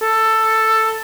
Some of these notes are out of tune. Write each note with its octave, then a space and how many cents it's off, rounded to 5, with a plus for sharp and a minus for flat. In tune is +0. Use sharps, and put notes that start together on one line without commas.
A4 +10